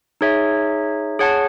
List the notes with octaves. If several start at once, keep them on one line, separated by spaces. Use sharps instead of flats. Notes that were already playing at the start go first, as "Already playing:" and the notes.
D#4 G#4 C#5 E5
G#4 C#5 F#5 A5